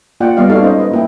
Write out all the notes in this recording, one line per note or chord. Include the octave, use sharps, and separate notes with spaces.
A#3 F4 D5 F#5 G5
G3 B3 G4 D5 D#5 F5
D#4 F#4 A4 D5 F5
C#4 D#4 A4 C5 C#5 D#5
B4 D#5
A#3 E4 G5